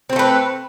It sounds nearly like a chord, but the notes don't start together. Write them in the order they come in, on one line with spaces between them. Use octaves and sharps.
C4 C5 A3 B4